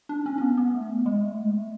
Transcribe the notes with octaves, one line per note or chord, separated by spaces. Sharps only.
D4
C#4
C#4
B3
B3
A3
B3
G#3
A3
G#3
A3